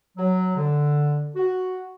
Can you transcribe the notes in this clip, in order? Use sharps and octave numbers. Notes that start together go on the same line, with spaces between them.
F#3
D3
F#4